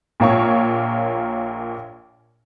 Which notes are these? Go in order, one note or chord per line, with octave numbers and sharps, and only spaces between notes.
A#1 A#2 A#3 F4 C#5 C#6